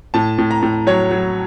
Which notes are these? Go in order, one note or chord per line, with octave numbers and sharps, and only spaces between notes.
A2 A5
A2
A#5
A2
F#3 C#5
F#3